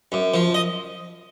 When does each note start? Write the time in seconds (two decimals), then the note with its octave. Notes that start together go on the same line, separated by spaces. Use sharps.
0.12 F#2
0.34 F3
0.54 D#5